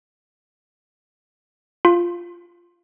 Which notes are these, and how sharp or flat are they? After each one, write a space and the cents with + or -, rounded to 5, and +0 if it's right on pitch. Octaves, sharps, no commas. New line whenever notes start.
F4 -5